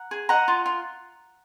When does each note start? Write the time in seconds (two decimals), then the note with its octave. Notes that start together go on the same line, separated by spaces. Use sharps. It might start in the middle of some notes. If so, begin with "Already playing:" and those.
Already playing: F#5 A#5
0.11 G#4
0.29 D#5 F#5 A#5
0.48 F4
0.66 F4